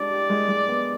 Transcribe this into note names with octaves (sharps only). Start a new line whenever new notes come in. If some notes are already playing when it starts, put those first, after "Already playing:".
Already playing: G#3 D4 G4 D5
G4
G#3
G#3
B3